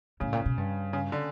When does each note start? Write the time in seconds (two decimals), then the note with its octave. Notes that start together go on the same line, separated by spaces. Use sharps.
0.20 A2 C#3
0.33 A#2
0.46 B2
0.57 G2
0.93 C#3
1.12 D3